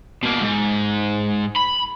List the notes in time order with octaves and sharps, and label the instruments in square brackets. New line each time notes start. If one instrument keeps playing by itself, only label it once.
[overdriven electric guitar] B2 A#3
G#2
B5